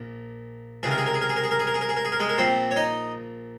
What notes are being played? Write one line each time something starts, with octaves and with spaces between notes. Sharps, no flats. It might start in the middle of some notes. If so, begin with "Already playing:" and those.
Already playing: A#1 A#2
C#2 C3 D#3 G#4
A#4
G#4
A#4
G#4
A#4
G#4
A#4
G#4
A#4
G#4
A#4
G#4
A#4
G#4
A#4
G#4
A#4
G#3 G#4
A#4
A#1 A#2 C4 C5
C#5
D#4 D#5